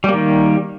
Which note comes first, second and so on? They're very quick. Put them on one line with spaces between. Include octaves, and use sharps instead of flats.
G3 A#3 D#3